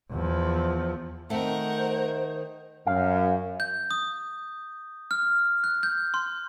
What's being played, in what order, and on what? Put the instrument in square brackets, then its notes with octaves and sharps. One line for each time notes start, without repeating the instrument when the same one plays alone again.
[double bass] E2 F3
[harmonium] D#3 [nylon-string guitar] A3 C4 [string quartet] A#4 F#5 [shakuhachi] C5
[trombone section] F#2 [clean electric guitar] F5
[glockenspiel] G6
D#6
F6
F#6
G6
C6